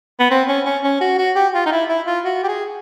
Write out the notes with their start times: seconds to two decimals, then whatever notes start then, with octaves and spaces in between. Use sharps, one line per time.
0.19 B3
0.31 C4
0.48 C#4
0.65 C#4
0.84 C#4
1.01 F#4
1.18 F#4
1.36 G4
1.54 F4
1.66 D#4
1.72 E4
1.89 E4
2.07 F4
2.25 F#4
2.43 G4
2.48 G#4